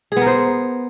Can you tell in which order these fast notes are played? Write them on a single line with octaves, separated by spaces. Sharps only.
G#4 B3 A#4 C5